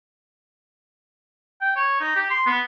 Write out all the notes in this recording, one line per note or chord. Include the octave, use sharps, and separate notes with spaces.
G5
C#5
D#4
G4
C6
B3